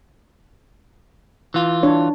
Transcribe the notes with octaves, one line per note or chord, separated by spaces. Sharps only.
E3 F4
D4 C#5